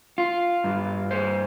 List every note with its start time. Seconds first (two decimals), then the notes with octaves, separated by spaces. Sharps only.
0.18 F4
0.64 G2
1.11 C5